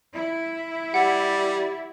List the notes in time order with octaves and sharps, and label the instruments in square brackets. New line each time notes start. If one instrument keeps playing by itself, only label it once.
[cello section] E4
[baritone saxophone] G3 [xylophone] F#5